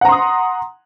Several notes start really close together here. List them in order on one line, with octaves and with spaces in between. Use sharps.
F#5 A#5 C6 D#6